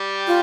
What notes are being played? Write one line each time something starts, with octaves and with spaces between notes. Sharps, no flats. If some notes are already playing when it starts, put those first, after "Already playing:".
Already playing: G3 G4
F4